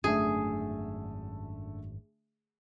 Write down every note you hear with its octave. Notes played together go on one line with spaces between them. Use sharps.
G#1 F#2 D3 A3 C#4 G#4 E5